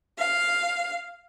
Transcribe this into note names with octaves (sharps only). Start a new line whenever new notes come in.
F5